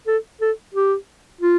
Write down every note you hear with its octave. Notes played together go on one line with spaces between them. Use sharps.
A4
A4
G4
F4